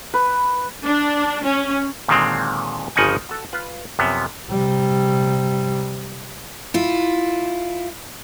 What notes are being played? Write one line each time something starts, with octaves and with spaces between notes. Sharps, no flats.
B4
D4
C#4
A#2 D3 D#3 F#3 G#3 C4
G1 C#3 F3 D#4 F#5 G#5
F#4 A4
F4 B4
F#2 C3 F3 B3
C3 G3
E4 F4